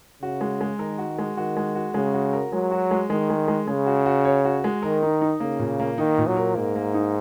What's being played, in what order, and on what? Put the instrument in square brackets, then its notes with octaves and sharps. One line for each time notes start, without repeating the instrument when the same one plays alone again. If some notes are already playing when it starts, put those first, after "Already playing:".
[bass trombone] C#3 [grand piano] F#4
[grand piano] G#3
G#3
[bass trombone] D#3 [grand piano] A#4
[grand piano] F#4
G#3
[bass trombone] D#3 [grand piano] F#4
[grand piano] G#3
F#4
[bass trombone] C#3 [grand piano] G#3
[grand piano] F#4
A#4
[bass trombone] F#3 [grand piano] G#3
[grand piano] F#4
G#3
[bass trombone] D#3 [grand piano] G#3
[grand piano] G#3
G#3
[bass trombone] C#3 [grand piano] G#3
[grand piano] F#4
F#4
C#5
F#4
G#3
[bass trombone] D#3 [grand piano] A#4
[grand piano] D#4
D#4
[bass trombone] C#3 [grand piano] A#3
[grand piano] A#2
A#3
[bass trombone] D#3 [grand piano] D#4
[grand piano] A#2
[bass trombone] F#3
[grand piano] A#4
[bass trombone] G#2 [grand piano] A#3
[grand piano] A#3
D#4